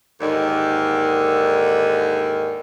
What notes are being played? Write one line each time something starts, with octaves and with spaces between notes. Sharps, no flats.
D#2 G#2 D3 D#3